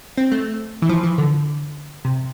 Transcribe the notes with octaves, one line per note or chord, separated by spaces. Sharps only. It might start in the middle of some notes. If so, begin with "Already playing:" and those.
C4
A3
E3
F3
E3
D3
C3